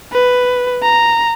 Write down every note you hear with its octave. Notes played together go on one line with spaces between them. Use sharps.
B4
A#5